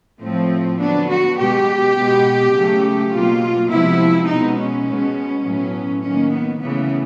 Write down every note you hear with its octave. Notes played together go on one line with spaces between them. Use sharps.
A2 F3 A3 C4
D3 F#3 B3 D4
F#4
B2 G#3 B3 G4
B2 G#3 B3
C#3 F#3 A3
B2 F#3 A#3 F4
C3 F3 G#3 B3 E4
B2 G#3 B3 D#4
C#4
B2 G#3 B3
A2 F#3 B3
D#3 F#3 A#3 C#4
B3
C#3 E3 A3 B3